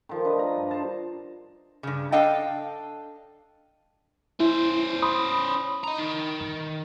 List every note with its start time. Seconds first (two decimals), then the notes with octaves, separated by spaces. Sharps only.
0.09 D#3 F3
0.25 D4 B4 D#5
0.39 A#5
0.56 G2
0.71 C5 A5
1.83 G2 C#3
2.12 D4 A4 D#5 F5 G5
4.40 C#4 E4 C5
5.02 B5 C6 D#6
5.84 D#5 A#5
5.98 D#3